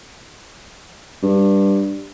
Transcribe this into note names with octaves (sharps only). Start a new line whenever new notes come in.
G2